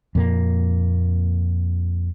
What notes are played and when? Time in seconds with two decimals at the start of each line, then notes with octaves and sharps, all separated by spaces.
0.15 F2 A#2 A#3